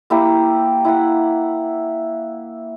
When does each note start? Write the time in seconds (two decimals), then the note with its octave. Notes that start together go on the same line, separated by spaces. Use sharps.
0.10 A#3 E4 G4
0.85 E4 F#5